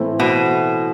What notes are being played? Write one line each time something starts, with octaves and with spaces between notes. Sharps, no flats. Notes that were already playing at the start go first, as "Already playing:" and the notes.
Already playing: A2 E3 A3 C4 E4
B2